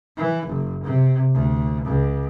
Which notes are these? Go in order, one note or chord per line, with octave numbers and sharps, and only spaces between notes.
E3
F#1
C3
D2
C#2